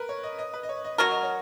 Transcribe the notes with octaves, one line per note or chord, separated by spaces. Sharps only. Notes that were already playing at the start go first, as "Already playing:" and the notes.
Already playing: A#4 B4
C#5
D#5
D#5
B4
D#5
C#5
D#5
F#3 C#4 F#4 A#4 C#5
D#5
C#5